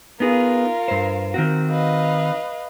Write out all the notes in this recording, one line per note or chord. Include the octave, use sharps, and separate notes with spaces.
B3 D#4 F4 G#4 A#4
G2 C5
D#3 C4 F#4
B4 D#5 F5